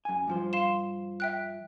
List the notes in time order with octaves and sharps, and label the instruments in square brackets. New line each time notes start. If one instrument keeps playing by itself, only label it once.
[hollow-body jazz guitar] F#2 G#5
G2 F3 C5
[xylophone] F5 C6 E7
E5 G5 F#6